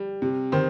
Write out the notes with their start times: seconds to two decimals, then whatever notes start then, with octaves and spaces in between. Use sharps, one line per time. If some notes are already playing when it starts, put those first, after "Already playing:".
Already playing: G3
0.22 C3
0.52 D#3 C5